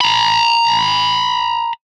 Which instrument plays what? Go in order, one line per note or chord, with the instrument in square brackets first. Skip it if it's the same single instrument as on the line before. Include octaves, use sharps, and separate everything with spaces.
[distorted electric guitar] A#5 B5